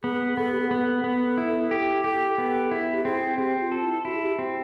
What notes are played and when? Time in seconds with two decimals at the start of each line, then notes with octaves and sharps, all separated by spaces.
0.03 B3 G#4
0.37 B3 A4
0.52 G4
0.60 G#4
0.71 B3 A4
1.04 B3 A4
1.38 E4
1.71 G4
2.04 G4 A4
2.38 B3 A4
2.71 E4 G#4
2.94 G4
3.04 C4 G#4
3.38 C4 G4
3.60 F4
3.72 A4
3.83 E4
4.05 E4 F#4
4.15 G#4
4.22 G4
4.39 C4